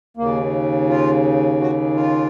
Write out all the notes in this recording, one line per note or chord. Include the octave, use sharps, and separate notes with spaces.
D#2 C#3 A#3
F4
F#4
F4